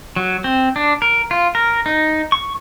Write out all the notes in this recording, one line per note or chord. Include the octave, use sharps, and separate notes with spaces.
F#3
C4
D4
A#4
F4
A#4
D#4
C#6